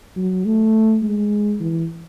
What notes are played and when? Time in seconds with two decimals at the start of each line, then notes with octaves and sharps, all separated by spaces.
0.16 F#3
0.45 A3
1.03 G#3
1.60 E3